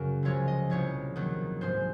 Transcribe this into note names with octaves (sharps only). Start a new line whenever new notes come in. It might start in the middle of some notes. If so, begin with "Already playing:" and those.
Already playing: F#2 C#3 F#3 F#4 A#4
C#2 C3 F3 G#3 C#5
D#5
C2 A#2 F3 C#5
D#2 D#3 F#3
G#2 F3 G#3 C5